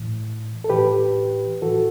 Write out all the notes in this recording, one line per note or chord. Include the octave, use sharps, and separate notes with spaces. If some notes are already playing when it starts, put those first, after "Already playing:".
Already playing: A2 E3
A4
A2 E3 G4 B4
A2 E3 F#4 A4